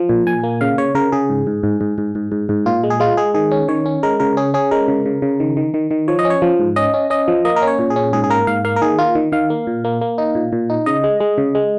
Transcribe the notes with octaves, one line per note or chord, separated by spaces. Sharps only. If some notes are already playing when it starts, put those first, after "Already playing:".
Already playing: F3
A#2
A#2 G#5
A#3
C#3 F5
C#3 C#5
C#3 A#4
C#3 G#4
G#2
G#2
G#2
G#2
G#2
G#2
G#2
G#2
A#2 F4
G#3
G#4
G#3 F4
G#3 G#4
D#3 G#4
C#4
D#3 C#5
C#4
G#3 A#4
C#3 A#4
C#4 G#4
C#4 G#4
G#3 A#4
C#3
C#3
C#3
D#3
D#3
D#3
D#3
F3 C#5
D#5
C#4
C#5
F3
G#2
C#4 D#5
C#4
C#4 D#5
F3
A#3 D#5
A#4
C#4
C#5
A#2
G#4
C#4
G#2 G#4
G#4
A#3 A#4
G#2 F5
A#3 F5
A#4
D#3 G#4
A#3 F4
D#3
D#3 F5
A#3
A#2
A#3
A#3
D#4
A#2
A#2
D#4
C#3 D#5
G#3
G#3
C#3
G#3